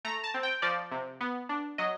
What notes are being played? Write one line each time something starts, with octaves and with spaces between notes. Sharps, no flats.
A3 A#5
A5
C4
G5
F3 D5
C3
B3
D4
F#3 D#5